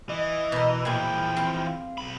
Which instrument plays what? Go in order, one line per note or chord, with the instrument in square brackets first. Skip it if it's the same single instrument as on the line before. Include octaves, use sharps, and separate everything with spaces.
[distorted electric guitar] E3 [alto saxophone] D#5
[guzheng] B2 A#4 [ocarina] B5
[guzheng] A#2 G#4 [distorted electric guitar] E3 F3 [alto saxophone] G5
[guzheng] C4
[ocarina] F5
[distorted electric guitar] B1 B5